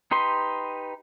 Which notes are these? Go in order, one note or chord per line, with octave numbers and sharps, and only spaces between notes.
D#4 G4 B4 C6